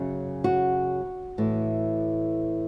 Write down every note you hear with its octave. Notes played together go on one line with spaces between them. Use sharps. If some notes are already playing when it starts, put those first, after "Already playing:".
Already playing: F#2 C#3 F#3
F#4
A2 E3